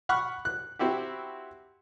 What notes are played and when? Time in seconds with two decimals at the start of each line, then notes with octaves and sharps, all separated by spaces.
0.09 F#5 B5 C#6 F6 F#6
0.45 F#6
0.79 C4 E4 F#4 G4